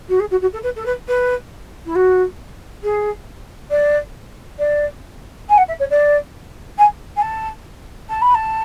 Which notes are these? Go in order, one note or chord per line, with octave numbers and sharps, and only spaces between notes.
F#4
G#4
F#4
F#4
A4
B4
A4
B4
B4
E4
F#4
G#4
D5
D5
G#5
F#5
E5
C#5
D5
G#5
G#5
A5
A5
B5
A5